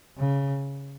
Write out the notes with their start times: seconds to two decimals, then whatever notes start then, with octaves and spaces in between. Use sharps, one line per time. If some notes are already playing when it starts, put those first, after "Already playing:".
0.18 C#3